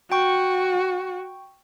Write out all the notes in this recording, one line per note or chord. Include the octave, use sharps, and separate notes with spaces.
F#4 G5 C#6